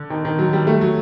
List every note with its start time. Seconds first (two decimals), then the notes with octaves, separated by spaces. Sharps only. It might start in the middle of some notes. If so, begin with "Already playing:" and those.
Already playing: D3
0.10 D#3
0.25 D#3
0.39 F#3
0.53 G3
0.67 A3
0.81 F#3